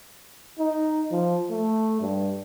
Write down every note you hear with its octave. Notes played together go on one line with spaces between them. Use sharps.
D#4
F3
A3
G2